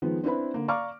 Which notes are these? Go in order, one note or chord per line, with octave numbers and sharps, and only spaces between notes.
D#3 F3 G#3 B3
C4 D4 E4 B4 B5
D3 A#3
D5 F5 A#5 C#6 D6 F6